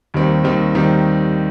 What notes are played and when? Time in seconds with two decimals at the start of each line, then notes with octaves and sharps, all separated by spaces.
0.14 D#2 D#3 G3 C4
0.44 D#2 D#3 G3 C4
0.74 D#2 D#3 G3 C4